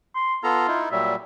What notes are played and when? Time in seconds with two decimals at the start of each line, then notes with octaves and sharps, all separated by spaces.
0.15 C6
0.44 B3 F4 A4 A#5
0.68 D#4 E4
0.91 A#2 F#3 G3 E5